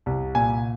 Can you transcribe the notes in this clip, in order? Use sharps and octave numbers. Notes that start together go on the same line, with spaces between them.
C2
A#2 G#5